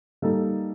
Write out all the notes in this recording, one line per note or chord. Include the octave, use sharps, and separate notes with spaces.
G3 A#3 D#4 A4